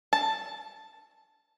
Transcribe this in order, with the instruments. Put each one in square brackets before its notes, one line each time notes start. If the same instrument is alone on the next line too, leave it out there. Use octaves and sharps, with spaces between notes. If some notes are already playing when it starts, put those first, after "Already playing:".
[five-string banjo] A5